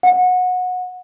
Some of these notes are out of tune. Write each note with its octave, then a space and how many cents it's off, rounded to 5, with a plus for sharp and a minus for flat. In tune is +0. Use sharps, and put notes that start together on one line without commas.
F#5 -20